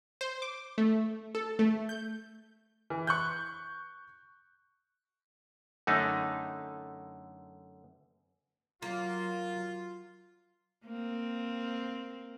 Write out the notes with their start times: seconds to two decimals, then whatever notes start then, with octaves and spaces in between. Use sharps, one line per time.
0.21 C5
0.42 D6
0.78 A3
1.35 A4
1.59 A3
1.89 G6
2.90 E3
3.07 C#6 F#6 G6
5.87 F#2 D3 A3 D#4
8.82 F#3 A#3 F4
10.85 A#3 C4